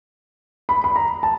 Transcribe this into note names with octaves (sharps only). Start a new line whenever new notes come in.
B5
B5
A#5
A5